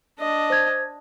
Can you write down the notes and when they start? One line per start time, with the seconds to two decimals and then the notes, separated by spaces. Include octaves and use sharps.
0.19 D4 D#5
0.50 C5 G#6